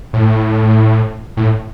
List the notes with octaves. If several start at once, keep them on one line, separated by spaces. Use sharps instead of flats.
A2
A2